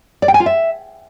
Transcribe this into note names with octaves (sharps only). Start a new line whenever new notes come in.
D5
G5
G#5
F4
E5